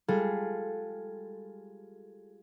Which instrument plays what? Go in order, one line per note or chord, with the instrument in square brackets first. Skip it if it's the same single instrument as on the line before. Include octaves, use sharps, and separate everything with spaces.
[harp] G3 G#3 F4 G#4 A4 F5